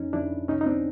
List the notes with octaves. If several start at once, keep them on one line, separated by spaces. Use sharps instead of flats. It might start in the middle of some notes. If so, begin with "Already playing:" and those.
Already playing: F2 C#4 D#4
F2 D4 E4
C2 C#4 D#4
D#4
C4 D4